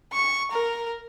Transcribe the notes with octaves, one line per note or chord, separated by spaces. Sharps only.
C#6
A#4